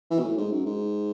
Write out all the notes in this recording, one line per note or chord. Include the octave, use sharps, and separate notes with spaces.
E3
B2
A2
G#2
F#2
G#2